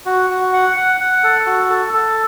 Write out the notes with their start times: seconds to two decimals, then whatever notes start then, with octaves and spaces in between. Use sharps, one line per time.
0.06 F#4
0.30 F#4
0.53 F#5
0.77 F#5
1.00 F#5
1.24 A4
1.46 F#4
1.70 A4
1.93 A4